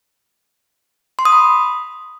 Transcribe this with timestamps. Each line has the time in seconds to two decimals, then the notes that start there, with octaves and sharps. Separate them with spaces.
1.19 C6
1.25 D#6
1.32 B5